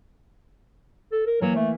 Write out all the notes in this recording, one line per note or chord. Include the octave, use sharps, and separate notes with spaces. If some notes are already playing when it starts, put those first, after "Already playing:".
A4
A#4
E3 F#3 A#3
A3